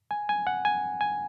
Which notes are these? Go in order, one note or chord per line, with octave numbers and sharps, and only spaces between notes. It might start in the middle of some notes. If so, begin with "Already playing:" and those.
G#5
G#5
F#5
G#5
G#5